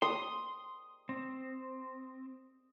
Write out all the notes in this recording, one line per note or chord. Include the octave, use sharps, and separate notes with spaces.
C6 D#6
C4